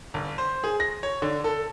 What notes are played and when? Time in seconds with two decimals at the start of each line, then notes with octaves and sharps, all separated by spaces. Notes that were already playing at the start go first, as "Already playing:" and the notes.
0.14 G1
0.38 C5
0.64 G#4
0.80 A#6
1.03 C#5
1.22 D3
1.44 A4